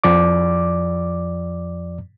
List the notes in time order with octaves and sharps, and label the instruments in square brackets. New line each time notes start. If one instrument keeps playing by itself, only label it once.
[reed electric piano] F2 F3 D5 D6